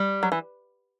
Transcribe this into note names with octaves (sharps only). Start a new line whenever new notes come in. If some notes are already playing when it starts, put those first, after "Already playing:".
Already playing: G3
F#3
E3